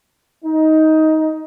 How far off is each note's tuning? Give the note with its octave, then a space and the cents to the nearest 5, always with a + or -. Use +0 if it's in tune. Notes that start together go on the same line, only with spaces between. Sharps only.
D#4 +15